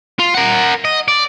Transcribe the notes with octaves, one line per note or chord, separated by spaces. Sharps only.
F4
A#4 F#5
D#5
D5